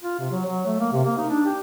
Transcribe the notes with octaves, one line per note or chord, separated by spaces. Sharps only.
F4
C3
F#3
F#3
A3
A#3
C3
A#3
D#4
D4
G4